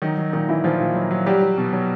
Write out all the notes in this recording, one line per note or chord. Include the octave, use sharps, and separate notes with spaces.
D#3 F#3 D#4
F#3
A#2 D#3 D#4
E3 F#3 E4
A#2 F3 F4
A#2
F#3
F#3
F#3 G3 G4
F#3
B2
F#3